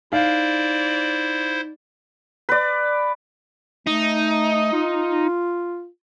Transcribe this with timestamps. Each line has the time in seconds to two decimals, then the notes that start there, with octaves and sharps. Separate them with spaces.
0.13 D#4 E4 C5 D5 F5
2.49 B4 D5
3.87 A3 D#4
4.73 F4